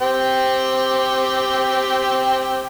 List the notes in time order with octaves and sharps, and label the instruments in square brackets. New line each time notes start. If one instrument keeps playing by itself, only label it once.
[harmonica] C4 G4 G5